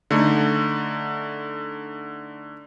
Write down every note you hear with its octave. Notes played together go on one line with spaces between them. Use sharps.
D3 A3 D#4